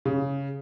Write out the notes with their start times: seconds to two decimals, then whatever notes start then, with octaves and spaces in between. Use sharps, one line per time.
0.05 C#3